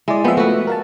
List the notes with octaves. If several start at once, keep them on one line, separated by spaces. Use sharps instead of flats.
G#3 E4 D5
F3 B3 E5 G5
A3 F#4 B4
A#4 F5 A5